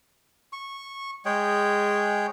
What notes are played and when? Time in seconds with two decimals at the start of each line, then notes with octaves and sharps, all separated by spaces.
0.53 C#6
1.25 G#3 G#4 C#5 G5